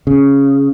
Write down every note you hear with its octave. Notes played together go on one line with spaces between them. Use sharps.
C#3